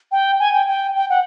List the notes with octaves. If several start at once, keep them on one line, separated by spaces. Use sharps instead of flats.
G5
G#5
G5
G5
G5
F#5